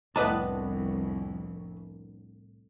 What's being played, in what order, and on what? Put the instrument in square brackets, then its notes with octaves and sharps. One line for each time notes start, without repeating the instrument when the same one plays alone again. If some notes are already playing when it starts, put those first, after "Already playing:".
[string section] C2 F2 [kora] A2 B3 D4 [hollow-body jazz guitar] B4 D#5 A5